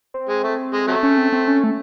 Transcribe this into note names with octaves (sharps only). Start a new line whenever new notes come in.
C4
G#3
A3
G#3
C3 F#3 A3
C#4
C4
C4
C#4
A3